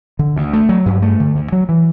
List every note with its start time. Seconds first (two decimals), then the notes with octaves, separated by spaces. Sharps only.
0.19 D3
0.36 D2
0.53 A3
0.69 F#3
0.86 G2
1.02 A3
1.20 D3
1.35 D2
1.52 F#3
1.69 E3